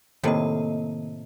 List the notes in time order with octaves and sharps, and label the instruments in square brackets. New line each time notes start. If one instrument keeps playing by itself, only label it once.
[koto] A2 C3 [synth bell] D#3 A#3 D#5